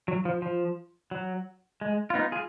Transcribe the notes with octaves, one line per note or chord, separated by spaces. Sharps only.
F#3
F3
F3
F#3
G#3
F4
B3 D#4
F4 G#4